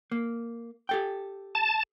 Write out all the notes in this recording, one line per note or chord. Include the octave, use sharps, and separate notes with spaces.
A#3
G4 A4 G5
A5